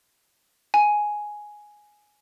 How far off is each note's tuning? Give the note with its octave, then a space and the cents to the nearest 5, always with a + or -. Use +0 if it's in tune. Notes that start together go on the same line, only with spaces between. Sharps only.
G#5 +5